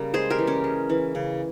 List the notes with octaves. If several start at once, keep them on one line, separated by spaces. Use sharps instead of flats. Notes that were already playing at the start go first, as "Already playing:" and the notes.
Already playing: C#3 G3 A#3 A#4
G#3 G#4 C5
G4 A#4
E3
C#4
G#3
E3
C#3